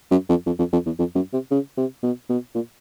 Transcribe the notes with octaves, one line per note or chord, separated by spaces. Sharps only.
F#2
F2
F2
F2
F2
E2
F2
F#2
C3
C#3
C3
B2
B2
A#2